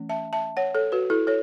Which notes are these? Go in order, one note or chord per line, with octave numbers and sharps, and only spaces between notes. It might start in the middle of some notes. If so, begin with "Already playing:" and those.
Already playing: E3 A3 C#4
E5 A5
E5 A5
C#5 F#5
A4 C#5
F#4 B4
E4 A4
A4 C#5